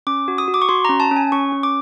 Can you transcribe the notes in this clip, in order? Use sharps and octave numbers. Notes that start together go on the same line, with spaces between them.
C#4 D6
F#4
D#6
F#4
D6
C#6
F#4 C6
C#4 A#5
A5
C#4
G#5
C#4 C#6
C#4
D6